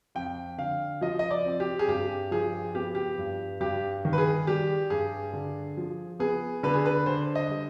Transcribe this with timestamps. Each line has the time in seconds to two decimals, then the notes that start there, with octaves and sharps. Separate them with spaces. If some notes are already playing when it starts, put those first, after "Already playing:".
0.15 F2 G5
0.58 D3 F5
1.01 F3 D#5
1.19 D#5
1.31 D5
1.45 C4
1.60 G4
1.79 G#4
1.88 G2 G4
2.31 F3 G#4
2.75 B3 G4
2.95 G4
3.18 G2
3.60 G2 G4
4.05 D#3
4.13 B4
4.18 G#4
4.47 G3 G4
4.90 G2 G#4
5.33 D3
5.77 F3
6.19 B3 G#4
6.63 D3 B4
6.74 G#4
6.86 B4
7.06 D3 C5
7.35 D#5
7.49 G3